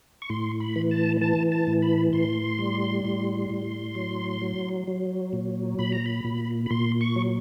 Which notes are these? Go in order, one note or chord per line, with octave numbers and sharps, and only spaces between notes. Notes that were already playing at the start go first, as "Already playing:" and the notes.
C#6
A2 C6
B5
E3
A5
E3 A5
A5
A2
B5
A2 C6
G3
A2
A2
F#3
F#3
F#3
A#2
A#2 B5
A#5
B5
A#2
B5
A#2 C6
C#6
F#3